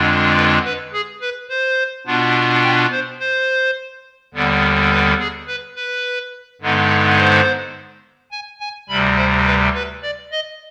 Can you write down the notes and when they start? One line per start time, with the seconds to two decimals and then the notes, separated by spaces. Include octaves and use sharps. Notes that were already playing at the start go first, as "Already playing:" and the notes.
Already playing: F2 D3 G#3 D4 F4
0.35 B4
0.64 B4
0.92 G#4
1.21 B4
1.49 C5
2.06 B2 B3 D4 F4
2.63 G5
2.91 C5
3.20 C5
4.34 D#2 D3 G3 B3
4.91 B4
5.19 G#4
5.47 B4
5.76 B4
6.61 G2 D3 G#3 B3 D#4
7.18 C5
8.31 G#5
8.60 G#5
8.89 D2 C3 G3 B5
9.17 C5
9.46 B4
9.74 B4
10.02 D5
10.31 D#5